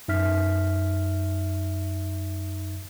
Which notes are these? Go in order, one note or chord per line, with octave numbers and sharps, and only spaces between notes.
F#2 D#4 E5 F6 B6